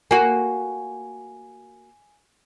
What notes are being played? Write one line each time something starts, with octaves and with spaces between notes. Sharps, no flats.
A#3 F#4 G#5